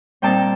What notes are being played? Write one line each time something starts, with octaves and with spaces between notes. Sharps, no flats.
A#2 G3 C4 D#4 G5 A5